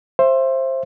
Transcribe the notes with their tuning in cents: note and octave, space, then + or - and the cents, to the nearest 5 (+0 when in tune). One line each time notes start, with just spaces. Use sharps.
C5 +15 E5 +25